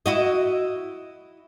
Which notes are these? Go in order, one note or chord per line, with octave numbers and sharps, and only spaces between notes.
E4 F#4 D#5